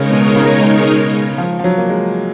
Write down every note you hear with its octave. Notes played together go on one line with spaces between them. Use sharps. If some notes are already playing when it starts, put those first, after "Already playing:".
Already playing: C#3 G#3 D#4 A#4 C#5
B2
C#3
F3
F3
F#3
A#3
G#3